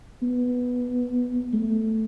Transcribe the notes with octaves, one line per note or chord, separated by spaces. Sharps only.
B3
A3